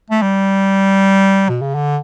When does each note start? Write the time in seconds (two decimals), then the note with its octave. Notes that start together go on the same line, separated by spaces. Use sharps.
0.10 A3
0.22 G3
1.49 B2
1.61 C#3
1.75 D3